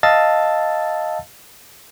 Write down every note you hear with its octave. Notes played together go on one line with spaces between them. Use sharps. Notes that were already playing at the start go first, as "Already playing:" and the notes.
D#5 F5 A5 E6 A6